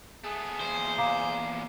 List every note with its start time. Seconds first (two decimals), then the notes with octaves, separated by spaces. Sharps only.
0.24 A3 B3 G#4
0.60 E2 A#2 C5
0.98 F5 A#5 D6